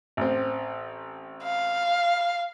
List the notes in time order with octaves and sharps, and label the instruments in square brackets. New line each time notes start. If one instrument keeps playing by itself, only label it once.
[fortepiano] A1 C4
[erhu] F5